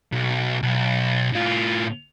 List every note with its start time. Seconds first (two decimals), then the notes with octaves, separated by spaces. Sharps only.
0.12 B1
0.63 B1
1.32 A2 F4